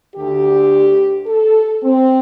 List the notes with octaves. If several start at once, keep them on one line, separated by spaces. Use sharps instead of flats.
D2 D3 G4
A4
C4